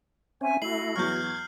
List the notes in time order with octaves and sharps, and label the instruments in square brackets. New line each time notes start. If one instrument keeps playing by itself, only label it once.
[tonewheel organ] C4 C#4 [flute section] E5 G#5
[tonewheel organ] A3 E4 [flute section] F#4 [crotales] C7 F#7
[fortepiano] E2 F#3 C#6 [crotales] F6 G6 [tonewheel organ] G#6